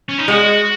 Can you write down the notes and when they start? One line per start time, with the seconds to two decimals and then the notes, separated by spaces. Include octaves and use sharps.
0.09 C#4
0.18 D#4
0.28 G#3 F#4